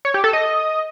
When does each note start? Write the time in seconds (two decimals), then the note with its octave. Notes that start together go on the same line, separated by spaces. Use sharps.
0.05 C#5
0.14 G4
0.24 A4
0.33 D#5